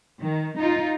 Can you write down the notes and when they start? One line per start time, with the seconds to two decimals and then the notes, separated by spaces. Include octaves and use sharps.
0.20 D#3
0.59 D#4 F4